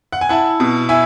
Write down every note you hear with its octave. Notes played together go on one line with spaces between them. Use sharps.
F#5
G#5
E4 F#5 A5
B2
E4 E5 G#5